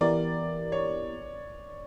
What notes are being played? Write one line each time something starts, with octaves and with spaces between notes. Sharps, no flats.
E3 B3 E4 G4 A#4 D5
C#5